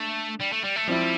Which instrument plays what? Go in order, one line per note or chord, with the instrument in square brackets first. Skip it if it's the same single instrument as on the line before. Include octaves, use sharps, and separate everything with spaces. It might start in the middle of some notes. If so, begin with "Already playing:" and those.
Already playing: [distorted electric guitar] A3 [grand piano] D4
[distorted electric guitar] G3
A3
G3
A3
[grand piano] F3 C4 E4 [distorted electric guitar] G3